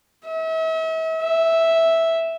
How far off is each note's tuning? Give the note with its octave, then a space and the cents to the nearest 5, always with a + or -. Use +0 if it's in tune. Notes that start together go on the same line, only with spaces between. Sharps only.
E5 -40
E5 -5